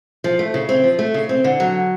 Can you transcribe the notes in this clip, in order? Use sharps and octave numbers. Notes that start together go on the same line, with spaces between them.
F3
A3
C#3
C4
F3
A3
C#3
C4
D3
F#3